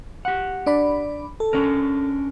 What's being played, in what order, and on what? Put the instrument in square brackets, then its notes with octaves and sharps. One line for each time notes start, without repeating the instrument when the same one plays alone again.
[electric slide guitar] G4 F#5
[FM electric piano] D4 D5 B5
A4
[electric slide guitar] C#4 D4 A#4